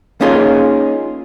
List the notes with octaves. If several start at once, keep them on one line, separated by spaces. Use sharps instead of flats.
A#3 C#4 D#4 F4 G#4 A#4